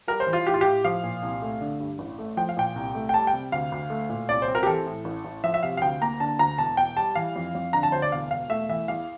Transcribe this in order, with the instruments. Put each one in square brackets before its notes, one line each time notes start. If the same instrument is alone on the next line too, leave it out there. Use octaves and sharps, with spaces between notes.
[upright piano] G3 A#4
C5
E3
F4
A2 G4
F4
A2 G4
F3 F5
A#2
C2
A3
D3
G2
A1
A3
F3 G5
F5
A#2 G5
C2
A3
G5
G3 A5
G5
C3
D2 F5
D2
A3
A#2
C2 D5
C5
C4
A#4
G4
E3 A4
A2
A1
A1
F3 E5
E5
C3 F5
F5
D2 G5
A#3 A#5
D3 A5
D2 A#5
E1 A5
E1 G5
G3 A5
E3 F5
F2
F2
D3 A#5
A5
D2 C5
D5
E1 F5
E1 F5
A3 E5
E3 E5
E2 F5